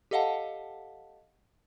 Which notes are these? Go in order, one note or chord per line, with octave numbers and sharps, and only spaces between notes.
G4 A4 D#5 F5 F#5 A5